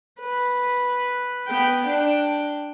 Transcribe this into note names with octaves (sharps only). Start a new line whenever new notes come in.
B4
B3 G5
D4 G5